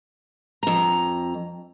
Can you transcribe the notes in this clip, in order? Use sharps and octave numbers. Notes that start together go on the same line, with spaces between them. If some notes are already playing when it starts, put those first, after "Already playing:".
F2 A#5